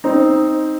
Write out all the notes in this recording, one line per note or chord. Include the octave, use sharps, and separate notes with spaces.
C4 D#4